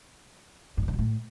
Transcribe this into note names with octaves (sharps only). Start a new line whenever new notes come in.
G2
E2
C#3
B2
A2